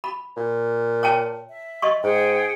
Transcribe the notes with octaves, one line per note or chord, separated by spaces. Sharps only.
B5
A#2
C#5 G5 A5
E5
D#5 C6 C#6
G#2 G#4 F#5 G5